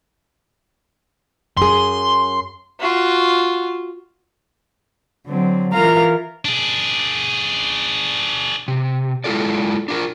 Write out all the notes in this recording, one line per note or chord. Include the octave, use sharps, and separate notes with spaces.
F#2 G#4 C6
F4 F#4
D3 F#3 C4
E3 F4 A#4 F5 A#5
D4 G#4
C3
G#3 E4 F4 A4 D5
D4 F4 A#4